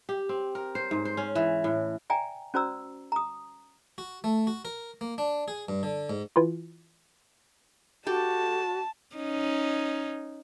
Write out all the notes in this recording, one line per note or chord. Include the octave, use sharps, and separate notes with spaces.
G4
C4
A#4
C5
G#2
C5
C#4
E3
A2
D5 E5 G5 G#5 A#5
C#4 F#4 C5 D5 A#5 E6
A#5 D#6
F#4
A3
F#4
A#4
A#3
D4
G#4
G2
D3
G#2
E3 E4 F4
F#4 G4 A4 A5
C#4 D#4